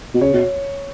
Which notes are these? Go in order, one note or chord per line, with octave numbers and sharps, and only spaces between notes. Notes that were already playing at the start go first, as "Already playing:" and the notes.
B2
C#3 C#5
B2